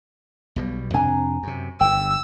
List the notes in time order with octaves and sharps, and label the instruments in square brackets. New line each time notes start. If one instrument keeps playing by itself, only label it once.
[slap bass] B1 B2 G3
[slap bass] F2 C3 D4 [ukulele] G#5 A#5
[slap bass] F#2 C3
[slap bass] G1 G2 [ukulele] G5 [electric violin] E6